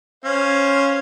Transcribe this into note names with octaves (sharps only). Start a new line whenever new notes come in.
C#4 C5 F5